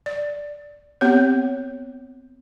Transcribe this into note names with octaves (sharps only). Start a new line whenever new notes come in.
D5
B3 C4 G4 C#5